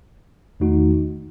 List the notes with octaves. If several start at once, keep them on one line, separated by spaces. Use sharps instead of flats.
E2 D#3 A3 D#4 F#4